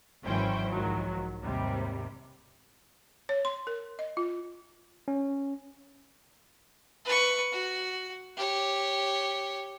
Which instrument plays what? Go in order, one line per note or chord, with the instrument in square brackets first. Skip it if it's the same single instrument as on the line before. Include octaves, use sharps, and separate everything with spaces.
[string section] G#1 E3 F#3 C#4 C5 G5
B1 G#2 D#3 F3 F#3
D#2 G#2 C3 G3
[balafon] C#5
C6
A#4
D#5
F4
[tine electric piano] C#4
[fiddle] B4 C#6
F#4
G4 C#5